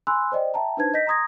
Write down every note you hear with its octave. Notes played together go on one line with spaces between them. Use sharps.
G#5 B5 C6 E6 F#6
C5 D5 D#5 G5
E5 G5 A5 A#5
D4 D#4 B4 C5 A5 G#6
D#5 G6 A#6 B6
A#5 C6 D#6 G#6 A#6